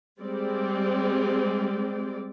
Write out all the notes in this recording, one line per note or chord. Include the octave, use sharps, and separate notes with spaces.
G3 G#3 C4 D5